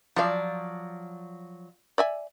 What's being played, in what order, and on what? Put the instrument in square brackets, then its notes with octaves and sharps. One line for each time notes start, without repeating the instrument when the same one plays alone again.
[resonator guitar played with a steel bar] F3 F#3 D5 [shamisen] F4 F5
[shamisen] D5 E5 G#5